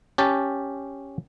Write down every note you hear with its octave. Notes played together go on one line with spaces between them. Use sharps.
C#4 G4 A5